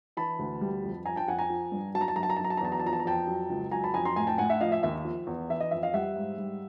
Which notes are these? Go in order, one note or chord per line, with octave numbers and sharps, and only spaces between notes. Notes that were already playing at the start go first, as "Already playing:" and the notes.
E3 A5 B5
D2
G3
F2
F3 G#5 A#5
G5 A5
F2 F#5 G#5
G#5 A#5
F3
G2
F#3 A5
A#5
A5
F#2 A#5
A5
A#5
A5
F#3
A#5
A5
A#5
E2 A5
A#5
A5
F3 A#5
A5
A#5
F2 G5 A5
F#3
C#2
F#3 G#5 A#5
A5 B5
F2 G#5 A#5
A#5 C6
A2 G#5 A#5
G5 A5
A2 F#5 G#5
E5 F#5
F3 D#5 F5
E5
D#2 E5
F3
E2
E3 E5
D#5
F2 E5
D#5 F5
G3 E5 F#5
G#2
G3